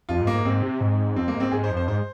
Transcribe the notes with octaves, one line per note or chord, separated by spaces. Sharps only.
F2 F4
G#2
A#3
G#2
G#2 C4
C3
G#2
F2 C4
A#3
G#2
C4
G#2 G#4
C5
F2
C5
G#2 C5